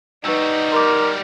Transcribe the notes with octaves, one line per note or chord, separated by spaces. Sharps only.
G3 D#4 F#4 B4 C#6 E6
A#4 C6 D6